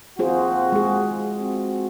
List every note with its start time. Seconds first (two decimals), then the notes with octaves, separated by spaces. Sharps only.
0.19 D#2 C4 F4 F#4 G#4 C5
0.72 G#3 G#4
1.40 C4 F#4